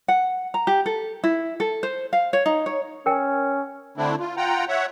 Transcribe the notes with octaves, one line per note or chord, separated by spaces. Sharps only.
F#5
A#5
G4
A4
E4
A4
C5
F5
C#5
D#4
C#5
C#4 A#4 G5
D3 A3 C4 D4 E4
F4
F4 F#5 G5 A#5
C#5 E5 F#5